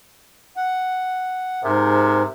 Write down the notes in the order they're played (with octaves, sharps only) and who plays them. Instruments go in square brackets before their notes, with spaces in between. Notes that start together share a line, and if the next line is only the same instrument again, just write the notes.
[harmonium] F#5
[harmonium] G#2 G#4 A#4 [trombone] C3